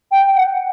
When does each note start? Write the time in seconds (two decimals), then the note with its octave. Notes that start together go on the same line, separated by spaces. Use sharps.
0.11 G5
0.36 F#5